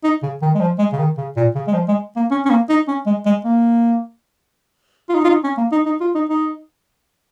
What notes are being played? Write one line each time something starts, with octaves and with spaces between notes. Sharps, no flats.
D#4
C#3
D#3
G#3
F3
G#3
C#3
D#3
C#3
A#2
C#3
G#3
F3
G#3
A#3
C#4
C#4
A#3
D#4
C#4
G#3
G#3
A#3
F4
D#4
F4
D#4
C#4
A#3
D#4
D#4
F4
D#4
D#4